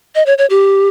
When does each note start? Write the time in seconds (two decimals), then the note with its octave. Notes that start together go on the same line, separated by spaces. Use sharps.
0.15 D#5
0.26 C#5
0.38 C#5
0.50 G4